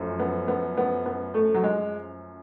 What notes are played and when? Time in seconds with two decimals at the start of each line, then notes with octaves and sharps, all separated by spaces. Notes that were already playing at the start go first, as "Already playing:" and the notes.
Already playing: F#2 F3 A3
0.19 B3
0.48 B3
0.77 B3
1.06 B3
1.34 A3
1.54 F#3
1.63 G#3